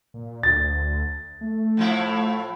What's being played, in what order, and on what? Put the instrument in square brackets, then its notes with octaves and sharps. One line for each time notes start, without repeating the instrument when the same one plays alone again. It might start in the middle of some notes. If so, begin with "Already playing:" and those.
[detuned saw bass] A#2
[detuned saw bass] D2 [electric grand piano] A6
[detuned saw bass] A3
[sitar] A2 F3 E4